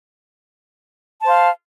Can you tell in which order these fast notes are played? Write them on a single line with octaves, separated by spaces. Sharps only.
A5 C5 F5